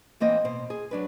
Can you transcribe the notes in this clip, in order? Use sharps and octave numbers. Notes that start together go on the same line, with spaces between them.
E3 A#3 C4 D#5
B2 C5
G#4
F#3 D4 B4